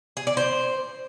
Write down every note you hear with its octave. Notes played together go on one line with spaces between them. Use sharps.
G#4
D5
C5